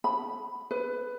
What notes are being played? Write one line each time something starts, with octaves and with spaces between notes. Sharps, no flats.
B5
B4